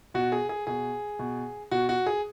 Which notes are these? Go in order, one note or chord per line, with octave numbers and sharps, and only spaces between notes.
B2 F#4
G#4
G#4
B2 G#4
B2
B2 F#4
F#4
G#4